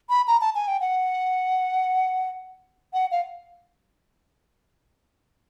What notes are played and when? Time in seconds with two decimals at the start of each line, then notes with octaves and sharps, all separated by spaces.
0.10 B5
0.27 A#5
0.41 A5
0.55 G#5
0.68 G5
0.81 F#5
2.93 F#5
3.11 F5